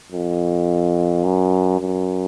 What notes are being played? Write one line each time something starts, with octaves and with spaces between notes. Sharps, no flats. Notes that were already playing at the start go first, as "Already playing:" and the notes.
F2
F#2
F#2